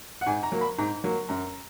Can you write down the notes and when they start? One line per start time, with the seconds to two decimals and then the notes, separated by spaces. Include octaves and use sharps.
0.21 F#5
0.26 G#2 G#5
0.43 A#5
0.52 F#3 A#3
0.61 B5
0.78 G#2 A#5
1.04 F#3 A#3
1.29 F#2 A#5